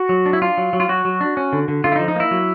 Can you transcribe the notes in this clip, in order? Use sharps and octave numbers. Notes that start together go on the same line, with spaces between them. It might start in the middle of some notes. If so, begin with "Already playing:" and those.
Already playing: F#4
F#3
D4
E4
D4 F4
F#3
F#3
F4
F#3 F#4
F#3
D4
C#4
D3
D3
D3 F4
E4
D#4
F3
D#4
A#3 E4
F#3